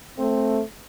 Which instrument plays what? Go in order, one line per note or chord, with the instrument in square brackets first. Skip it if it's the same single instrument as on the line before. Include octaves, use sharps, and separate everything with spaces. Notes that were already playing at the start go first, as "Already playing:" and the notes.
[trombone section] A3 C4